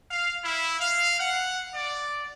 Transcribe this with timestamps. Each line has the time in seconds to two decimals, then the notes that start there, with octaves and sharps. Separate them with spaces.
0.10 F5
0.44 E4
0.80 F5
1.19 F#5
1.75 D5